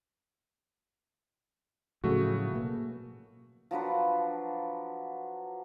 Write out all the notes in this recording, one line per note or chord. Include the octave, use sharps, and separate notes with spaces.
A2 C#3 F3 F#3 A3 F#4
B2 A#3 B3
F3 F#3 D4 B4